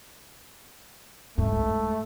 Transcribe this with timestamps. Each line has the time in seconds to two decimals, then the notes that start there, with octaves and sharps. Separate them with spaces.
1.38 G#2 G#3 A3